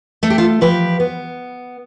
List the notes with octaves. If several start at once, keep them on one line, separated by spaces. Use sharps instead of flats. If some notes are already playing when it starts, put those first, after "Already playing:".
A3 A4
G4
F4 A4
F3 G4 B4
B3